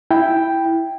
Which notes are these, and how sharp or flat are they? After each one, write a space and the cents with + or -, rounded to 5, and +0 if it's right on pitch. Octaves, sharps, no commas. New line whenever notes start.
E4 +0 G5 +0